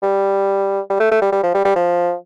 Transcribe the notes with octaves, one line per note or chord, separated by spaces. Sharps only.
G3
G3
A3
A3
G3
G3
F3
G3
G3
F3